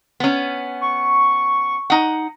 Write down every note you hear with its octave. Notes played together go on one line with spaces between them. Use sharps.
B3 C#4
C#6
D#4 F#5